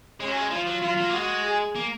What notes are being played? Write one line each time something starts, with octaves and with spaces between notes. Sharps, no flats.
G#3 C#4
F#3
G#3
F3 F4
F#3
F#3 F4
F#3
A#3
G#3 F#4
G#4
A#3